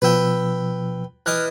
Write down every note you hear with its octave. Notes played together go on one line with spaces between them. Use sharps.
B2 F3 B4 G5 E6
E3 D#5 D6 F6 F#6